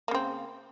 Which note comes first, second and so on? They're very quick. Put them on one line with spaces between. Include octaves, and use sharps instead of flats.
A#3 C#3 C4